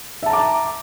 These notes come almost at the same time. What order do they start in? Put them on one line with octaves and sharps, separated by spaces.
E5 A5 A#5 D6